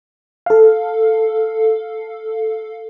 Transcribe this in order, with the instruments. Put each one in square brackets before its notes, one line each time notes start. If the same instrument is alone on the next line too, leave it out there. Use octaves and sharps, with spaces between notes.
[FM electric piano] A4 F5